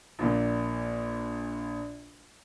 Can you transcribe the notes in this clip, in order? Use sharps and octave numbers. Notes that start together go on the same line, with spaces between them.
A#1 A#2